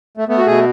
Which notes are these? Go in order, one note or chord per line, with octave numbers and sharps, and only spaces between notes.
A3
A3 B3
F#4
B2 G#4